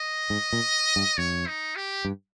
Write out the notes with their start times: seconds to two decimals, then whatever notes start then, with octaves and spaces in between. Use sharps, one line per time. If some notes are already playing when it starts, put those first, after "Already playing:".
Already playing: D#5
0.30 G#2
0.53 A#2
0.96 G2
1.17 F2 C#5
1.47 D#4
1.76 G4
2.05 G2